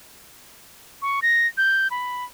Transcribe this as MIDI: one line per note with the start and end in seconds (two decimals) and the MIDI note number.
1.02 1.20 85
1.22 1.47 94
1.57 1.88 91
1.91 2.24 83